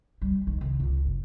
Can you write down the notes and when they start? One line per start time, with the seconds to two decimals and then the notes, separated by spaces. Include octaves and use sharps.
0.22 G3
0.47 D#3
0.61 C2
0.80 C#2
1.05 F#1